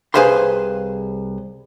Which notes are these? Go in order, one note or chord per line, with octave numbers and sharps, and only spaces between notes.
C2 G#4 B4 C5 F5 C6